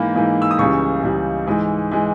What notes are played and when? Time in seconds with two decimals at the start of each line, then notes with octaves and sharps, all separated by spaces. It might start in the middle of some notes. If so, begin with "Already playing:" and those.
Already playing: G#2 E3 A#3 B5
0.15 G#2 E3 A#3
0.42 E6
0.51 D#6
0.58 C#2 C#3 E3 G3 C#6
1.03 C#2 C#3 E3 G3
1.47 G#2 E3 G#3
1.91 E3 G#3